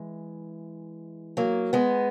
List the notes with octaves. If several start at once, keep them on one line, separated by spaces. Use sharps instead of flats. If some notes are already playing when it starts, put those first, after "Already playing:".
Already playing: E3 G#3
F#3 A#3
G#3 B3